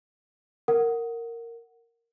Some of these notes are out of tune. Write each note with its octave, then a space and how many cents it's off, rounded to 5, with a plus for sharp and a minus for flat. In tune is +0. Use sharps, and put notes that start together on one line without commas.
A#4 -10 F#5 +0